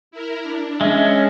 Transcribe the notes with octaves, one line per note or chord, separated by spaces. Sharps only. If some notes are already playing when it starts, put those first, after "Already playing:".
E4 A#4
D4
G#3 C#4 D4 E5